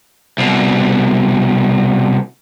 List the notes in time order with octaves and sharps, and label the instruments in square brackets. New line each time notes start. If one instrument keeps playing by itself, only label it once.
[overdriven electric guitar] C2 B2